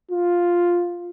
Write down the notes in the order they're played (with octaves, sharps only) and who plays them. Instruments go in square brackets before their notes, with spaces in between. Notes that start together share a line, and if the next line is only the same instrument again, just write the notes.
[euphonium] F4